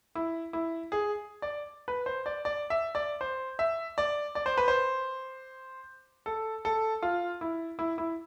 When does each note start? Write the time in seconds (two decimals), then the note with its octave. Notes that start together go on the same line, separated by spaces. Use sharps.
0.15 E4
0.53 E4
0.92 G#4
1.42 D5
1.88 B4
2.06 C5
2.26 D5
2.45 D5
2.70 E5
2.95 D5
3.21 C5
3.59 E5
3.98 D5
4.35 D5
4.46 C5
4.57 B4
4.68 C5
6.26 A4
6.65 A4
7.03 F4
7.41 E4
7.79 E4
7.98 E4